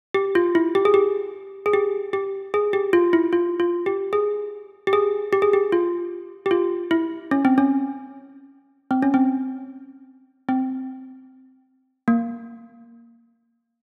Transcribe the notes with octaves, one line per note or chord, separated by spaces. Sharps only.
G4
F4
E4
G4
G#4
G4
G#4
G4
G4
G#4
G4
F4
E4
F4
F4
G4
G#4
G4
G#4
G4
G#4
G4
F4
G4
F4
E4
C#4
C4
C#4
C4
C#4
C4
C4
A#3